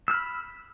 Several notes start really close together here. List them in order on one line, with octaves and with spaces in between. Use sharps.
E6 F6 B5